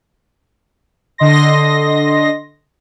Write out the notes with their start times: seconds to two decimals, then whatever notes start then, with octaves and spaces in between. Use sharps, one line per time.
1.18 D3 D#5 C6 A#6